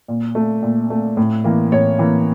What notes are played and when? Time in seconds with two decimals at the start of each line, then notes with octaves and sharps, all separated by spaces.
0.08 A#2
0.35 A3
0.62 A#2
0.90 A3
1.17 A2
1.44 E3 A#3
1.72 A2 C#5
1.99 E3 A#3